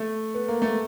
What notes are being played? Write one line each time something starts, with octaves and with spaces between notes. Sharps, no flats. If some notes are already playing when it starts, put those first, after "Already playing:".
Already playing: A3
B3
A#3
A3